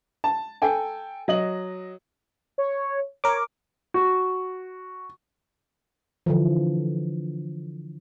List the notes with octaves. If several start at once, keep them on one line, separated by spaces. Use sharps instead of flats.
A5
A4 G5 G#5
F#3 D#5 F#7
C#5
A#4 C#5 D6
F#4
D3 E3 F3